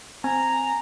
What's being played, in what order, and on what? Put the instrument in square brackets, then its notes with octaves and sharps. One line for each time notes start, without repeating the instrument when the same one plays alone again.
[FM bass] C4 [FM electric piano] G#5 [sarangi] A#5